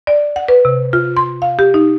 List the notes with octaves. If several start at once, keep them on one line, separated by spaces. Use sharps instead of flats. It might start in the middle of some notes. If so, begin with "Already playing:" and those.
D5
F#5
B4
C3
F4
C6
F5
G4
D#4